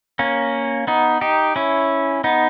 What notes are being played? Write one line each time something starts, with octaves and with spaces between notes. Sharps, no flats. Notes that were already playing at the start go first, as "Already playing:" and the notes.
A#3 C#4
B3 D#4
D#4 G4
C#4 E4
B3 D#4